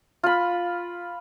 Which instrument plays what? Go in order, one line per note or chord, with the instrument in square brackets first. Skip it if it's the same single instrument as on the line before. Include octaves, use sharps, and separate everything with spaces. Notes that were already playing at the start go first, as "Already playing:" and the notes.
[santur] F4 B5